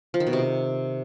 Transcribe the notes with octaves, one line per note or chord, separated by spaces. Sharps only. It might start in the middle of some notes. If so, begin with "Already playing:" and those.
F3
D#3
B2
C3